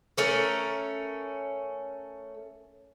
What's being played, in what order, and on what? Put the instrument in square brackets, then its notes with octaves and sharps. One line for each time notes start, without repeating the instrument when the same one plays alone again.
[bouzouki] A3 C#4 A#4